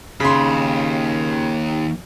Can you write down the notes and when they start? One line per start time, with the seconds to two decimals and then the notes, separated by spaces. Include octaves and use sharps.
0.20 D#2 C#3 B5 C6